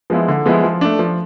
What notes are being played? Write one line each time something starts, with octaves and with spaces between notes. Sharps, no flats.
F3 G#3 B3 E4
D3
F3 G#3 B3 E4
F3
A3 D4
F3